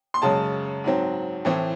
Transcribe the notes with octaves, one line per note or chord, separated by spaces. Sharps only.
C6
F#2 C#3 G#3 C#4 A5
G#2 F#3 C4
A2 E3 C4